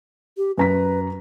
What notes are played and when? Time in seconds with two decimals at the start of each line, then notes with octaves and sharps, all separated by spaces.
0.37 G4
0.58 F#2 B4 A#5 B6